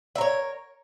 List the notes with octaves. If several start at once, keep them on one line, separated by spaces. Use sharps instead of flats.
A#4 C#5 E5